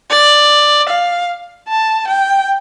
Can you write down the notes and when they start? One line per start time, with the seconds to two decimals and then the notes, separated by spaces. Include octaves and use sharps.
0.10 D5
0.89 F5
1.68 A5
2.08 G5